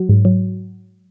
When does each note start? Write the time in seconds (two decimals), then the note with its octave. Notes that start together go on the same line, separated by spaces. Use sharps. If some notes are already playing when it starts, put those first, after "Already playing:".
Already playing: F#3
0.09 G#2
0.25 F#3